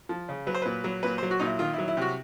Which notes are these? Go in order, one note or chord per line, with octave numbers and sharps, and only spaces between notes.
F3
C#3
F#3 B4
C5
A#2 B4
F#3
A#2 B4
F#3 C5
F#4
A#2 D#4
E4
D#3 F4
E4
F#3
E4
C3 F#4